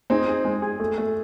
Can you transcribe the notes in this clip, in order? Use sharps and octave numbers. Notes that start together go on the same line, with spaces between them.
C4 D#4 G#4
G#4
G#3
G#4
A3
A3